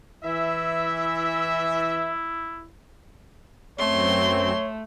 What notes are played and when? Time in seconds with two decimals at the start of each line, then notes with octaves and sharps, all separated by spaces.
0.24 E3 E4 E5
3.79 F#2 A3 C4 C#5 C6